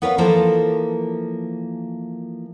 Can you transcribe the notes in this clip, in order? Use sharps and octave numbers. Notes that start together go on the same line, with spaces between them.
B3 A#4 B4 C#5 E5 F5
E3 F3 A#3 A4 A#4 C5